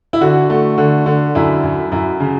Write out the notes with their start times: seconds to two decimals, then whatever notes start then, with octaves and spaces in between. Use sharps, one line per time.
0.13 E4
0.21 D3 F#4
0.50 A3
0.78 D3
1.06 D3
1.35 F#2 E4
1.63 F#2
1.92 F#2 E4
2.20 C#3